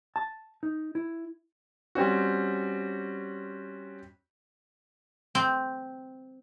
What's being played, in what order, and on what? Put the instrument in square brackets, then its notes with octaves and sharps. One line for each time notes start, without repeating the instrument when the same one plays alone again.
[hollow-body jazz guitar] A5
D#4
E4
[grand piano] G3 C4 C#4 F#4
[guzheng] C4